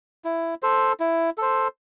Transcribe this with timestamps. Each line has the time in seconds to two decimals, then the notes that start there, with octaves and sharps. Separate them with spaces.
0.24 E4
0.62 A4 C5
1.00 E4
1.38 A4 C5